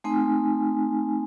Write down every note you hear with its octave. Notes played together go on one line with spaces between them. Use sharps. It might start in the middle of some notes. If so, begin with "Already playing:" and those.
A3 C4 D#4 G#5